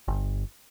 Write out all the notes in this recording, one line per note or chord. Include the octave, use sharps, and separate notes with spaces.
G1